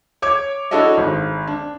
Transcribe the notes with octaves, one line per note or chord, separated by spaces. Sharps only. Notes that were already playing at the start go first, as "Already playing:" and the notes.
C#5 D6 G#6
D4 E4 F#4 A4 C#5 D#5
G#1
D4